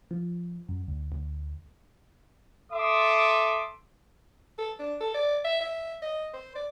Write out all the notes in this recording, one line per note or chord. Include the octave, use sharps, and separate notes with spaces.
F3
F#2
D2
D2
A4 E5 C6 D6 D#6
A4
D4
A4
D5
E5
E5
D#5
C5
D5